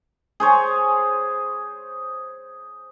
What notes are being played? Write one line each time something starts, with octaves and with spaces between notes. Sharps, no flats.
G#4 C5 C#5